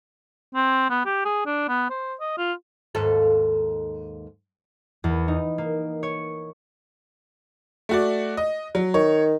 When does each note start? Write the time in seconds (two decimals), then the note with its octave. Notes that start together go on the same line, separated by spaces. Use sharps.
0.55 C4
0.90 B3
1.06 G4
1.25 G#4
1.46 D4
1.68 B3
1.90 C5
2.20 D#5
2.38 F4
2.95 D#2 G#2 A4
5.04 E2
5.28 D#4
5.58 A#3
6.03 C#5
7.89 A3 F#4 D5
8.37 D#5
8.75 F#3
8.94 D#3 C#5